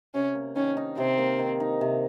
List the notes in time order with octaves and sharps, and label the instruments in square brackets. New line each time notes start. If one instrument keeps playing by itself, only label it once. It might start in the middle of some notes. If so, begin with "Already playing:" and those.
[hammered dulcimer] C3 [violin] C#4
[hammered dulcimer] A#3
[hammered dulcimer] D#3 [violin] C#4
[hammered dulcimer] D#4
[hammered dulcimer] C3 [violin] C4
[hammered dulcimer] A#3
D#3
D#4
C3